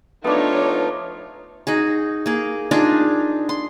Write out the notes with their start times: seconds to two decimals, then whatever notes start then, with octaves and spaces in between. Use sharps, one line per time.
0.24 F3 A3 B3 D4 D#4 F4 C#5
1.67 D#4 F#4 G#4
2.26 A#3 G#4
2.71 D4 D#4 F4 G#4
3.49 C6